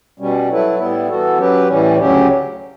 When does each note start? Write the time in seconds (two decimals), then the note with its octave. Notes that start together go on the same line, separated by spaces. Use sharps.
0.19 B2 G3 C#4
0.49 F#3 A3 E4 B4
0.78 A2 G3 B3 E4
1.09 E3 B3 F#4 A4
1.38 F#3 C#4 G4 B4
1.68 A2 E3 G3 C#4
1.98 D2 C#3 F#3 C#4 G4